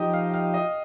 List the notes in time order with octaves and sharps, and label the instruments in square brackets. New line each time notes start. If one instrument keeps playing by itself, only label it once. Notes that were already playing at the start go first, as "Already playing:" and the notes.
Already playing: [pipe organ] F3 D#4 G4 [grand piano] D#5 G5
[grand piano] F5
F5
D#5